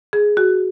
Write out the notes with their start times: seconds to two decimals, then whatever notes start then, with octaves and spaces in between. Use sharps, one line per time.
0.13 G#4
0.37 F#4